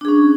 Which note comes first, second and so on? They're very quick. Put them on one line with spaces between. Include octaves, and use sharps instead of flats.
D4 G#4 C#4